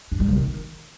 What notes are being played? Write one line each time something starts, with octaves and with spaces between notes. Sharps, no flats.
D4
G3
C#3
D#3